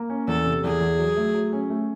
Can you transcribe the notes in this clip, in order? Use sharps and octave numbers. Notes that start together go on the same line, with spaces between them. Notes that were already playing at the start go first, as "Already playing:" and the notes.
Already playing: A#3
C#4
E2 A4
C3
E2 G#4
E2
F#3
A3
F#3
C#4
A3